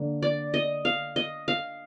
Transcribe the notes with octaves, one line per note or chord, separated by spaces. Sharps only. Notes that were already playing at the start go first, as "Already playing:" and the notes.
Already playing: D3 A#3
D5
D#5
F5
D#5
F5